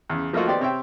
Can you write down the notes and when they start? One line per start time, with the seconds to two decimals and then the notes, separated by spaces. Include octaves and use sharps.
0.10 E2 C#3
0.33 F3 A3 A#3 D#4 F4 F#4
0.47 D#3 B3 G4 C5 D5
0.60 C3 C4 C#5 E5 G5